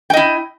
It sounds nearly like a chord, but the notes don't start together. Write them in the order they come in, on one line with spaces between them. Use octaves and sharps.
G5 D#5 E4